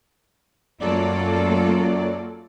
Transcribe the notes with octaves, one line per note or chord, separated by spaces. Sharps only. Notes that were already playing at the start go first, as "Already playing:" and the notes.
F#2 F#3 A#3 F4 A4 D5